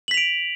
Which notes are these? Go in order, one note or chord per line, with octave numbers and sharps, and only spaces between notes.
B6 D7 F7 F#7